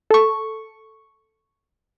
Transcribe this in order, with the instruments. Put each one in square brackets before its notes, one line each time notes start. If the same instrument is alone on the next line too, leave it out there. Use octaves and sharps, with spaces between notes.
[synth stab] A4 C#6